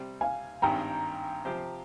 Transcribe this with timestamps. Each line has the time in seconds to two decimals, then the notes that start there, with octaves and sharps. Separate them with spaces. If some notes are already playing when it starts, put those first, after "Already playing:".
Already playing: C3 G3 C4
0.21 F5 G#5
0.62 G#1 G2 D#3 G3 G5 A#5
1.45 C3 F3 C4 G4 C5